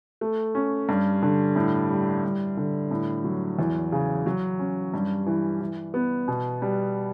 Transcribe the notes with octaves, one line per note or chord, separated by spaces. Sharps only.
A3
C#4
G2
D3
A2
G3
G2
D3
A2
F#3
E2
C#3
F#3
C#4
G2
E3
E3
B3
B2
G3